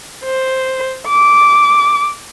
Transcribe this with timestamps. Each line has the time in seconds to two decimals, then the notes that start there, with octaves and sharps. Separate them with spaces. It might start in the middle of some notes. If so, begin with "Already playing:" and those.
0.24 C5
1.08 D6